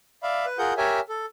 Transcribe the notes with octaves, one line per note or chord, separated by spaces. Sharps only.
D5 E5 F5 B5
B4
F4 G#4 A#4 F#5 G6
G4 A#4 C#5 E5 G#5
A4